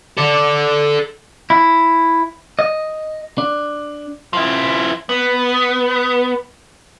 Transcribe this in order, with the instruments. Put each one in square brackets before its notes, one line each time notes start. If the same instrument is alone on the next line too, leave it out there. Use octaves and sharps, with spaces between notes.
[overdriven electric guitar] A4 D5
[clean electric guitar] E4
D#5
D4
[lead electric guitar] F3 E4
B3